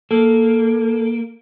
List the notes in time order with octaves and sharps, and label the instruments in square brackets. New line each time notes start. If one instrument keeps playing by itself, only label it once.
[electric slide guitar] A#3 [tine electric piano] A4